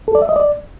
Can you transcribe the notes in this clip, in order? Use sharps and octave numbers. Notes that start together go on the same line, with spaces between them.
A4
D5
E5
D#5
D5